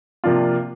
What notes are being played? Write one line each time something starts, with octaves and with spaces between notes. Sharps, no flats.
C3 F3 A#3 D4 F4